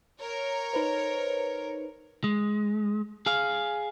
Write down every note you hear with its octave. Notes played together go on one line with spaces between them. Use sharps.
A#4 C#5
D#4 B4 C5
G#3
G#4 F5